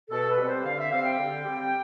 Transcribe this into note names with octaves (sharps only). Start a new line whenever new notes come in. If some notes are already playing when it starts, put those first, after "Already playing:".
B2 A4
B4
G3 C4
C5
D3 F5
E5
G3 C4 F5
G5
D3
G3 C4